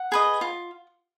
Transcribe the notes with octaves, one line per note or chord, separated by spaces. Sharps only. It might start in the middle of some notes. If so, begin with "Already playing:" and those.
Already playing: F#5
G#4 B4 D#5
F4